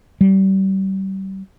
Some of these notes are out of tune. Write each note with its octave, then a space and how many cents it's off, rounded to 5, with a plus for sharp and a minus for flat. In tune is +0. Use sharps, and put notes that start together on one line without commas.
G3 -30